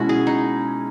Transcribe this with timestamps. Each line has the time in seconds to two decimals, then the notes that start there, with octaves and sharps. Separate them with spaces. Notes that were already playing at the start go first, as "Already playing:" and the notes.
Already playing: B2 G#3 C#4 E4 F#4
0.09 G#4
0.27 D#4